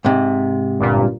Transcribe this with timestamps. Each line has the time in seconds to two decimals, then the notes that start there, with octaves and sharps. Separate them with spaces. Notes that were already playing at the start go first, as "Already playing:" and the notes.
0.05 G#2 C3
0.79 G1 G2 A#2